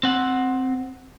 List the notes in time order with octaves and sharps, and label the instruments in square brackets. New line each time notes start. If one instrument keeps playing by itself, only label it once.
[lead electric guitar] C4 F#5